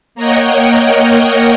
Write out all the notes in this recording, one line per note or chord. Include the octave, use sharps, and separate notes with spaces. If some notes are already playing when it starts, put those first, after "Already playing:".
A#3 A#4 C#5 D#5 F#5 G5